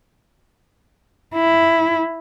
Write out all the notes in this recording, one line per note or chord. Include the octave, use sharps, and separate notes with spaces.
E4